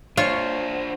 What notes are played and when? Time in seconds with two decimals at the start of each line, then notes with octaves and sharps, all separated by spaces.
0.17 D4 F4 C5 C#5